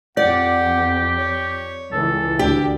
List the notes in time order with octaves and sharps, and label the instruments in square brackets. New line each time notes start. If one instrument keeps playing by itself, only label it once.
[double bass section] F2 [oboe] G4 [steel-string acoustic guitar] D5 [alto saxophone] F#5
[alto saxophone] C#5
[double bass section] C#2 E3 [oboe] A4
[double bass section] D2 [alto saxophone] D4 [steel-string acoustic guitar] G4